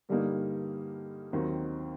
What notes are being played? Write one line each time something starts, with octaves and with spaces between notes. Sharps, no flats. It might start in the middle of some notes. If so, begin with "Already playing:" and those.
G2 D3 G3 A#3 D#4
D#2 D#3 F#3 C4